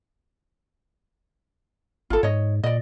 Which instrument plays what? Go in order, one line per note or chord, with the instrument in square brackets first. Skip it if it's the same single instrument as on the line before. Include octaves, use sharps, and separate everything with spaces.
[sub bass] G#1 [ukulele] F4 A4
[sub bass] G#2 [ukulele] C#5 D#5
[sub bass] A#2 [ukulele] D5 D#5